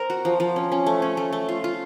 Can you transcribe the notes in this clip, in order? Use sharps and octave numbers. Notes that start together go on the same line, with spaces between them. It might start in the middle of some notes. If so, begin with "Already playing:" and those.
Already playing: C4 A#4
F#4
F3
F3
C#4
C#4
A3
C#4
A3
A3
F4
F4